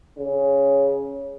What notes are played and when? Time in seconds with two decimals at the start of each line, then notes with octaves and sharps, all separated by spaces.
0.18 C#3